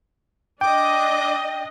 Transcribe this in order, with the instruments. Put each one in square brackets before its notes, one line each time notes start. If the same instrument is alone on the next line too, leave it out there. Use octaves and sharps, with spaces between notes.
[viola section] D4 D#5 [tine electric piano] G5 [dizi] D6